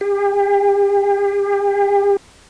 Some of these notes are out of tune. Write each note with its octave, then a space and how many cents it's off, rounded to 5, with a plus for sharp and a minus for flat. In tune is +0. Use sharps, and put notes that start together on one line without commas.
G4 +40